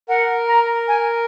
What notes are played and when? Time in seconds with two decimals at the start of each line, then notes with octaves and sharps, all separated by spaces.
0.09 A#4 F#5
0.48 A#5
0.88 G#5